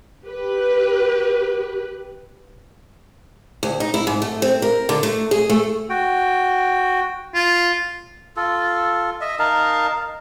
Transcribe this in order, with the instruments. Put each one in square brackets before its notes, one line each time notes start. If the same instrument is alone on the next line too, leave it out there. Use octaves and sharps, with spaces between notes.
[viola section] G4 B4
[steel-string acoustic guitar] D2
D#4
E4
G#2
A3
C4
A#4
D3
A3
G#4
A3
[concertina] F#4 G5
[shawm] F4
[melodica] F4 A4
D#5 E5
D#4 A#4 F5 A5